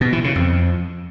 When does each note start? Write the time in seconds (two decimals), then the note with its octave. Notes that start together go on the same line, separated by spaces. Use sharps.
0.01 B2
0.12 E3
0.24 C#3
0.35 F2